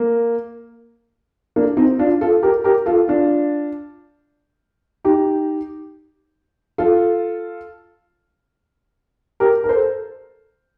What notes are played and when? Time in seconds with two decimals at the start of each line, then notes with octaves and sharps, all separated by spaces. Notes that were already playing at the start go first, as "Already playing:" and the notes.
Already playing: A#3
1.56 A#3 D4
1.77 C4 D#4
1.99 D4 F4
2.21 F4 A4
2.43 G4 A#4
2.64 G4 A#4
2.86 F4 A4
3.08 D4 F4
5.05 D#4 G4
6.78 F4 A4
9.40 G4 A#4
9.64 A#4
9.69 A4 C5